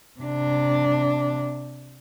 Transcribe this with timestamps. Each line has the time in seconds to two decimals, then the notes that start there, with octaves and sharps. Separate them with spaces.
0.20 C3 D4